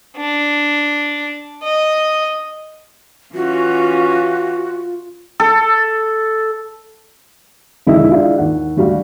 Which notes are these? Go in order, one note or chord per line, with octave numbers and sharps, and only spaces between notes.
D4
D#5
E3 C#4 F4 F#4
A4
E1 D3 D#3 G#3 E4 D#5
D4 E4 F4 G#4
D#2 F#5
D2 G3 F#4 F5